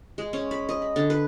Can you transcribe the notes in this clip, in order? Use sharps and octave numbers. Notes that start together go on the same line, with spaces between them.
G#3
C#4
B5
D#5
B5
D3
B4